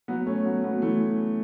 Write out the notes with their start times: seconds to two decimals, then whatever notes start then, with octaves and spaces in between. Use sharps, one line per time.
0.08 F#3 B3
0.26 A3 C#4
0.45 F#3 B3
0.64 F#3 B3
0.82 E3 A3